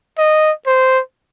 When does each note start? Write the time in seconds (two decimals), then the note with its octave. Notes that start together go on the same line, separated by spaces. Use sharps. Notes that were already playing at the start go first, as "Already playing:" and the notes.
0.18 D#5
0.67 C5